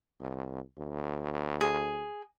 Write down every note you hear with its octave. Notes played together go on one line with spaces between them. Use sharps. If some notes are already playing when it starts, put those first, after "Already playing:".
C2
D2
G#4